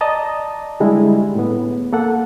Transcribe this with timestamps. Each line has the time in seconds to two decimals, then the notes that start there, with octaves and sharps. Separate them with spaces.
0.01 D5 D#5 A5 A#5
0.80 D3 G3 G#3 E4
1.35 A2 B3
1.93 A#3 A4 F#5